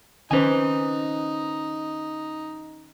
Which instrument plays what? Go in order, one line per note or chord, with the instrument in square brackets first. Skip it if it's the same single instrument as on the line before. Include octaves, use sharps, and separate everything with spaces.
[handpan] D#3 C#4 C5 [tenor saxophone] D#4 [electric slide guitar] B4 G#5